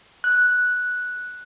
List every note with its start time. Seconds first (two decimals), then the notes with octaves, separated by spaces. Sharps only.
0.24 F#6